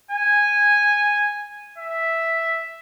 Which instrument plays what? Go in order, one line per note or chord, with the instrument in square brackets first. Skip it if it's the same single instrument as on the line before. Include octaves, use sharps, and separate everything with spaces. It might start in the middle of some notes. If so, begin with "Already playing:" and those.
[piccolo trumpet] G#5
E5